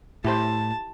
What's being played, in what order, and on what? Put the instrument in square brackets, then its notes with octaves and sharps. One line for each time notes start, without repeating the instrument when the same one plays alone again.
[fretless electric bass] A2 [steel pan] E4 G4 C5 [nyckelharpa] A5